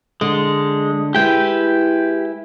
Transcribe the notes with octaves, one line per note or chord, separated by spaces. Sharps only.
D3 G#3
G#3 E4 G4 B4 G5